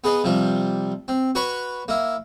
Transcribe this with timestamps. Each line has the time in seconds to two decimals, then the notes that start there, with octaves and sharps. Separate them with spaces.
0.04 B3 G#4 B4 D#5
0.24 C3 F3 G3
1.08 C4
1.35 F#4 B4 C#5 F#5 B5 C#6
1.88 A#3 E4